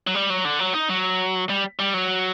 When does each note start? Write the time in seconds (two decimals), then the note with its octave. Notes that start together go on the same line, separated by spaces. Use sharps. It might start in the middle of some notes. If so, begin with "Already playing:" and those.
0.07 F#3
0.15 G3
0.30 F#3
0.45 D3
0.59 F#3
0.74 D#4
0.89 F#3
1.49 G3
1.79 G3
1.94 F#3